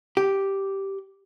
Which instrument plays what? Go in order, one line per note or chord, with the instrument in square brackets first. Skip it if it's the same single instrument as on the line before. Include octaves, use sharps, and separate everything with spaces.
[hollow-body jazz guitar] G4